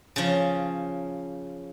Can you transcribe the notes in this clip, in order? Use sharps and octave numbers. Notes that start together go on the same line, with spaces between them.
C#3 F3